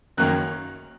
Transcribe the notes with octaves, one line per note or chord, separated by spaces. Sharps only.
F#1 F#2 D#3 A#3 C#4 F#6